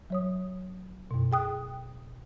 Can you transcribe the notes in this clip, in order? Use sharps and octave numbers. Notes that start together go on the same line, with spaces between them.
F#3 C#5 D#6
F#2 B2
G#4 G5 D#6 F#6